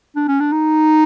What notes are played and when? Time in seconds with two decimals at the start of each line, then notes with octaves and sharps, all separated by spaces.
0.16 D4
0.28 C#4
0.40 D4
0.52 D#4